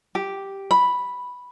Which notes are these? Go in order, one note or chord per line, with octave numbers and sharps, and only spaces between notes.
G4
B5